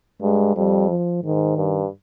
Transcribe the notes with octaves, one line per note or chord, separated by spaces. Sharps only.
G2 G#3
F2 G3
F3
G#2 D#3
G2